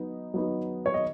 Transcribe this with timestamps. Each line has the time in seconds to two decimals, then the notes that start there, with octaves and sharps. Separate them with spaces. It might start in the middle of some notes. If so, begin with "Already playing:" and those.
Already playing: F#3 B3 D#4
0.34 F#3 B3 D#4
0.86 C#5
0.94 D#5